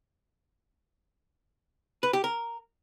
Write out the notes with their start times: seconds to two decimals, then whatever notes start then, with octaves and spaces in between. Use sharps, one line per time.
2.03 B4
2.13 G4
2.24 A#4